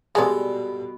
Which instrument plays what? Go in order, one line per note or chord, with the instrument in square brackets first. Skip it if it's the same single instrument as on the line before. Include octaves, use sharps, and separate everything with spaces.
[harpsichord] G2 A4 [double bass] B2 [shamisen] G#3 D5